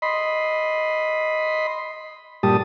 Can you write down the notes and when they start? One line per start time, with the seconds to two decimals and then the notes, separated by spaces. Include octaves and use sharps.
0.02 D#5 B5 C6
2.43 G2 A#2 G3 G4 A5 D#6